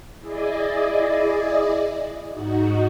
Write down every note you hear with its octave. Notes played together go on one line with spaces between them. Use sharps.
E4 G#4 D5 D#5
G#2 D#4 F#4